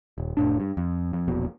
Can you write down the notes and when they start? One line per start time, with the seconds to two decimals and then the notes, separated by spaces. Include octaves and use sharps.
0.18 D#1
0.37 F1 A2 D4
0.60 G2
0.77 F2
1.13 F2
1.28 E1 A#1 B2